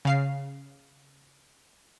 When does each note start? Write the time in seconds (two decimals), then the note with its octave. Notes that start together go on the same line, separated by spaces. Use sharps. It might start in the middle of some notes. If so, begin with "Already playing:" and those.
0.05 C#3 F5 C7